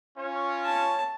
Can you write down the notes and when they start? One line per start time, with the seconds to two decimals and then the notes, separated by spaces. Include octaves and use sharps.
0.17 C#4 F4 C#5
0.65 A5